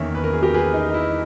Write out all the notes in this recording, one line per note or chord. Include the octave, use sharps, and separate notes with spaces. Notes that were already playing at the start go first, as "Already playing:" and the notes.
Already playing: E2 D#3 A#3 C#4 C#5 E5
B4
A#4
G#4
G4 A#4
G#4 B4
D#4
D#4
E4